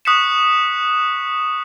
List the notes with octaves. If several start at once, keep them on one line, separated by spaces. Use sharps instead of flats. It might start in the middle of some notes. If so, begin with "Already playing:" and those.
C#6 D#6 F#6 B6 C#7 E7